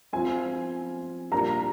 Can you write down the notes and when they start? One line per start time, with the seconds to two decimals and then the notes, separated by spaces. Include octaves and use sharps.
0.13 F3 C4 F4 G#5
1.32 A#2 G3 A#3 D4 A#5